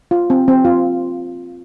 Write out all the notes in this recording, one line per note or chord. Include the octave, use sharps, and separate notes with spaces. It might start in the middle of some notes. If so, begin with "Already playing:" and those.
F4
C4
C4
F4